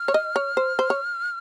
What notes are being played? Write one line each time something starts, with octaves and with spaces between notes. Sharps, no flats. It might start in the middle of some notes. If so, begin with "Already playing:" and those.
Already playing: F6
C#5
D#5
C#5
C5
C5
C#5